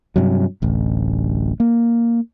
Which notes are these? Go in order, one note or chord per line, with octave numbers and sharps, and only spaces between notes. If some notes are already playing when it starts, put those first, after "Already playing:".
G2 C3 F#3
D1 A1
A#3